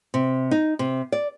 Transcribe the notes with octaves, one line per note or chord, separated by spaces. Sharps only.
C3
D#4
C3
D5